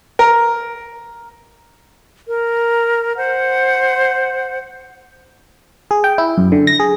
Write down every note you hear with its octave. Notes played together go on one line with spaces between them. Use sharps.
A#4
A#4
C5 F#5
G#4
G5
E4
F#2
D3
A#6
G#4